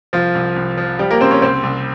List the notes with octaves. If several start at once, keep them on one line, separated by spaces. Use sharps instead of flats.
C2 F3 F4
C2
C2
F3
F3 G3 G4
A#3 A#4
C#3 C4 C5
C#4 C#5
C2 C4 C5
C2